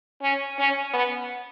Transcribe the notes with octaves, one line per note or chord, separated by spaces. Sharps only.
C#4
C#4
B3